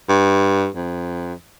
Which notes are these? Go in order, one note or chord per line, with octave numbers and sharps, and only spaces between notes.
G2
F2